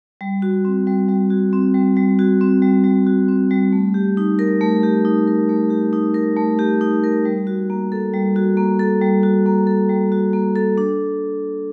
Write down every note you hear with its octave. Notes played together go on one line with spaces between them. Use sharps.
G3
F#4
C4
G3
G3
F#4
C4
G3
G3
F#4
C4
G3
G3
F#4
C4
G3
A3
G4
D#4
A#4
A3
G4
D#4
A#4
A3
G4
D#4
A#4
A3
G4
D#4
A#4
G3
F#4
A#3
A4
G3
F#4
A#3
A4
G3
F#4
A#3
A4
G3
F#4
A#3
A4
D4